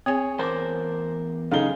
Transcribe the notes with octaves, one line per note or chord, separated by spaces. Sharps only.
C4 G#4 C#5 G#5 D#6
E2 A#4 C5 A5 D6
F#2 C#3 D#4 G#4 A4 F5 G7